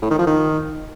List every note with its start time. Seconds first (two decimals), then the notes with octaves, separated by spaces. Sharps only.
0.02 A2
0.10 D#3
0.19 F3
0.27 D#3